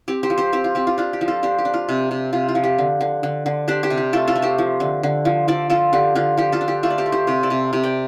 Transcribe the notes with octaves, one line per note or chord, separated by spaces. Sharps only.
C4 G4
G4 C5
F3
G4 C5
C4 G4 C5
F4
C4 G4
F4
D4 F4
G4
F3
F4 A4
D4 G4 C5
G4
D4
F4
C3
C3
C3 F4
F4
F3
G4
D3
D3
D3
D3
D4 G4 C5
G4 C5
C3
G4
A3 F4 A4
F4 A4
A3
G4 C5
F3
D3
D3
F3
F3 A4 D5
F3 F4 A4
D3 G4
D3 F4
F3 G4
F4 A4
D4
G4
A3 F4 A4
D5
G4 C5
A3
G4 C5
C3 G4 C5
A4 D5
C3
C3 G4
D5 G5